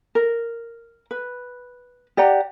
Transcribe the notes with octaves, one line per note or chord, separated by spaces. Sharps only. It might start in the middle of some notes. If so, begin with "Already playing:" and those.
A#4
B4
G4 D5 F#5 A#5